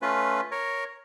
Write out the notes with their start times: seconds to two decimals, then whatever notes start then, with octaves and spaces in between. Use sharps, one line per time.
0.02 A3 C#4 F4 B4
0.51 A#4 C#5